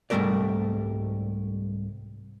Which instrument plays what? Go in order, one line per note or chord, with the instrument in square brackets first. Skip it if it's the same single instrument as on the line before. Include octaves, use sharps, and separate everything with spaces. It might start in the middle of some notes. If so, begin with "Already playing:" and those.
[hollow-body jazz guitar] C2 G#2 G3 A3 A#4 D5